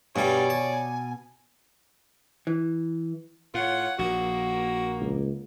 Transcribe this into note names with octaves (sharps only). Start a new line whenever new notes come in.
G2 B2 G3 C#5 D5 G#5
A5
E3
A2 F4 C#5 F#5
A#1 A#3 F#4 A#4
C#2